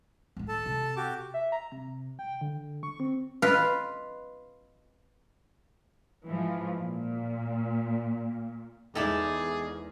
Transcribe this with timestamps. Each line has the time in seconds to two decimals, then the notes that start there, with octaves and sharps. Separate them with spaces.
0.36 D1 D#3
0.48 A4 A5
0.66 C3
0.96 F#4 G4 D6
1.34 E5
1.52 A#5
1.72 C3
2.19 G5
2.41 D3
2.83 C#6
3.00 C4
3.42 F4 B4 D#5 F5
6.26 G#2 E3 F3
6.79 A#2
8.95 E2 G#2 D#4 E4 G#4 A4 D5